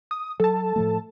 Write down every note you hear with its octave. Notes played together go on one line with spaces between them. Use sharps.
D#6
F#3 A4 A5
A2 F3 A3